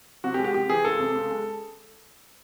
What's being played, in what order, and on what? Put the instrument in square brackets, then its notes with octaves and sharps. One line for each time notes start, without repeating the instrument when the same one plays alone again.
[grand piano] C3 F#4
G4
G#3
G4
C3 G4
E3 G#4
C#2 A4
C3
C#2
G#3